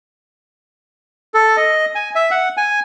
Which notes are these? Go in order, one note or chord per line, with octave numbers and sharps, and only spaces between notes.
A4
D#5
G#5
E5
F#5
G#5